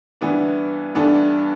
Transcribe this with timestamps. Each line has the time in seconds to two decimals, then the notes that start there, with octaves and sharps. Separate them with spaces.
0.21 G2 E3 B3 D4
0.95 G2 E3 B3 D4 A4